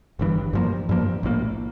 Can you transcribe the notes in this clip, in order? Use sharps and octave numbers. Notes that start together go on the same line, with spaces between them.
G1 G2 E3
G2 F3 A#3
G2 F3 A#3
A#1 A2 E3 A#3